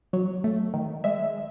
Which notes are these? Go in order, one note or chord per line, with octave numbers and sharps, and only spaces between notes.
F#3
A3
D#3
G#3 E5